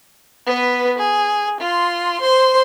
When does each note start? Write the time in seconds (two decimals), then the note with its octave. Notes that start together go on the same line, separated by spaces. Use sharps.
0.46 B3 B4
0.98 G#4
1.60 F4 C6
2.21 C5 C6